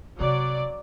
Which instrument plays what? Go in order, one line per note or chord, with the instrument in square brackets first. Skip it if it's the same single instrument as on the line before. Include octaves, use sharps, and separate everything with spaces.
[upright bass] C3 [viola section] F#3 D5